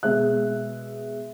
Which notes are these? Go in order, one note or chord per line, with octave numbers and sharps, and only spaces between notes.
B2 G#3 E5 F#6